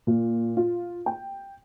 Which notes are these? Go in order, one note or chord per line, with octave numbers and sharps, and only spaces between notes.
A#2
F4
G5